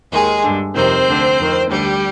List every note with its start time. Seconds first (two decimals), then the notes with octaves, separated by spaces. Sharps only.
0.12 D#2 D#3 G#3 G#4
0.44 G2 D3
0.75 F2 C3 D#3 C4 C5
1.07 D2 D3
1.39 F2 D#3
1.70 D2 D3 G3 G4